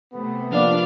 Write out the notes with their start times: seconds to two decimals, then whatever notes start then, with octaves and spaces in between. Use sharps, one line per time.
0.13 C3 A3 B3
0.51 F3 A#3 D4 D5 F5